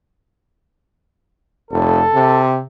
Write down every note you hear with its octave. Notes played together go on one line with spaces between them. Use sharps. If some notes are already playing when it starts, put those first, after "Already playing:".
F1 A4
C3